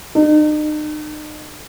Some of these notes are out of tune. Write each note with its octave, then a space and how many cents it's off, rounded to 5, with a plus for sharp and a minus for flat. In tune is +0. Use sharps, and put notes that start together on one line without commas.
D#4 -40